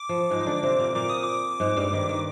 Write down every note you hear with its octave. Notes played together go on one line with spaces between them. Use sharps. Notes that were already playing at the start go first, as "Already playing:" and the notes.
Already playing: D6
F3
G#2 G#3
D#4
D3 D4
C3 C4
A#2 A#3
A#2 A#3 D6
D#6
D6
G#2 G#3
G2 G3
D#3
D#3